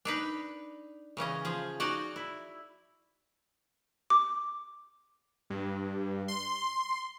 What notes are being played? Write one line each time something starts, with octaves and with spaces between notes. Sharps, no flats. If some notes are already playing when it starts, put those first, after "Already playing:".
D4 D#4 B4
C#3 E3 C#4 D#5
F3 G#4
D#4 F#4 D5 F#5
E4
D6
G2
C6